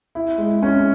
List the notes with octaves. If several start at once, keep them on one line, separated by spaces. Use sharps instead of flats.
E4
G#3
C#4